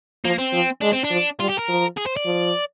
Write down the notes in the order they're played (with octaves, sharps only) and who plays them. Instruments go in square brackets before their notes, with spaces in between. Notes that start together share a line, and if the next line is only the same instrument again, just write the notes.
[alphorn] F3 [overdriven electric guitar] A#3
[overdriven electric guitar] C4
[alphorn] F3
[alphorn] G#3 [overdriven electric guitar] D4
[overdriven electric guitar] C4
D4
[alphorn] F3
[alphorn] G3 [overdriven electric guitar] F4
[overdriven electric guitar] G4
A#4
[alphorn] F3
[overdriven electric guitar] G#4
C5
D5
[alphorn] F3